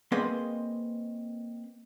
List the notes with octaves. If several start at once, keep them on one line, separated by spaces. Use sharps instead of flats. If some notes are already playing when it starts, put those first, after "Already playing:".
A#3 C4 G#4 B4 D#5 C6